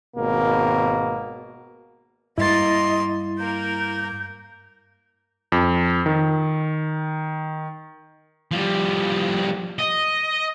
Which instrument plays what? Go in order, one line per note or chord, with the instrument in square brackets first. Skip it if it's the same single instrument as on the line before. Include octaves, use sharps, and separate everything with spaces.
[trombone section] G#1 B2 A#3
[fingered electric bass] G2 G3 G#3 [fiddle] A#3 C6 [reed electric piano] E4 A6 [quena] D#5
[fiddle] A#3 A#4 [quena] G6
[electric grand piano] F2
D#3
[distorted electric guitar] F3 G3
D#5